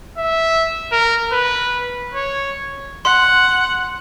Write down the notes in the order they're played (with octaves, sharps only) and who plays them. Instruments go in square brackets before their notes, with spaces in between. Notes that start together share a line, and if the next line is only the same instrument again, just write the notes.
[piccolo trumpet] E5
A#4
B4
C#5
[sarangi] F#5 [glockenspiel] C6